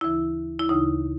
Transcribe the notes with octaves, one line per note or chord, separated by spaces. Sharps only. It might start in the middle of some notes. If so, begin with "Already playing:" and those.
D2 C#3 E3 E4
E4
D2 C#3 E3 D#4